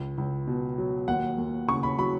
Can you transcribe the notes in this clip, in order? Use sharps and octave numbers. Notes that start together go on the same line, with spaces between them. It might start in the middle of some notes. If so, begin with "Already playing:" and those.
Already playing: C#2
C#2
B2
F#3
D#2 F#5
D#2
C#3 C#6
B5
F#3 B5